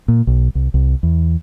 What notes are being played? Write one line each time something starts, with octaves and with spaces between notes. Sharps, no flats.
A#2
B1
C2
C2
E2